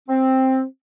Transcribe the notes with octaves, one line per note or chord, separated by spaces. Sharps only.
C4